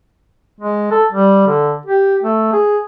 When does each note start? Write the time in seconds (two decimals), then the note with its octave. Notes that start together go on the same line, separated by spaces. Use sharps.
0.60 G#3
0.91 A4
1.12 G3
1.47 D3
1.86 G4
2.23 A3
2.53 G#4